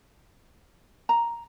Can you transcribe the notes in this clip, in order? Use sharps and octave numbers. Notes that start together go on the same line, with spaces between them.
A#5